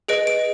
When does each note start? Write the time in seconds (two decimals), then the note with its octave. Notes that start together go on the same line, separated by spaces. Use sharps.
0.08 G#4 B4 D#5 D7
0.27 D7